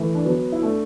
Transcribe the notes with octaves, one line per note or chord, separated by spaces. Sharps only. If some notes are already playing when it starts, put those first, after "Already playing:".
Already playing: E3 A3
D4
F#3 B3
E4
A3 D4